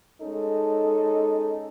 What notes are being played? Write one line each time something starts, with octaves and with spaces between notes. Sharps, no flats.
G#3 C#4 D#4 A4